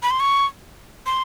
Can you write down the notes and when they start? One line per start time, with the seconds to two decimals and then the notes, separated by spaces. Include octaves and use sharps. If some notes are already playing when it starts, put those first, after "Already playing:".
0.03 B5
0.11 C6
0.20 C#6
1.06 C6